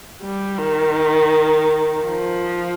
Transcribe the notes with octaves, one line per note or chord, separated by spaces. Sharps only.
G3
D#3
F3